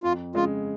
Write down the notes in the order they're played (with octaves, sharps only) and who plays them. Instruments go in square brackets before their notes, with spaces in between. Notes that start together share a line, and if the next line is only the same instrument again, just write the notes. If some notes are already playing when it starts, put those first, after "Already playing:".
[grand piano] F2 [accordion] F4
[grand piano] C#3 G#3 [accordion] F4